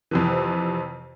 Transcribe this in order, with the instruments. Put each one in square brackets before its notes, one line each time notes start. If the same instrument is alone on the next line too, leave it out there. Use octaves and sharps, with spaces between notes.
[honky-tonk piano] F2 C3 E3